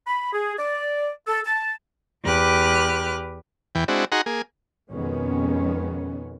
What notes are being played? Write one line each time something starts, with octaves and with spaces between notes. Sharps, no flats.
B5
G#4
D5
A4
A5
E2 G4 B4 D6 F6 F#6
E2 E3 G5
G#3 C4 D4 E4 F#4
D#4 F#4 G#4 F#5 A#5 C6
A#3 G#4
F2 B2 D#3 G#3 B3 C#4